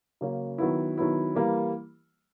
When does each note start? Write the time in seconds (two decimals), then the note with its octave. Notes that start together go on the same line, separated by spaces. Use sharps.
0.21 C#3 F#3 A#3 C#4
0.58 D#3 F#3 B3 E4
0.98 D#3 F#3 B3 E4
1.36 E3 G3 A#3